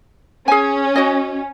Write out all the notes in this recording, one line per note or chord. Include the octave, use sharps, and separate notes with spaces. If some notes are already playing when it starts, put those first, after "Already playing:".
C#4 G#4 G#5
F#4 D#5